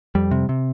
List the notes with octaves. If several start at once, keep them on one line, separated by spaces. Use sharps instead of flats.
F2 G3
C3
C3